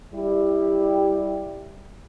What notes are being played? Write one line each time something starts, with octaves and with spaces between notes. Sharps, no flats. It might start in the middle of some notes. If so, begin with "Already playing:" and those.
G3 E4 G4